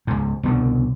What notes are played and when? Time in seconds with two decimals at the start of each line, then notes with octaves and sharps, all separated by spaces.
0.07 C#2 G#2
0.43 C2 B2 D3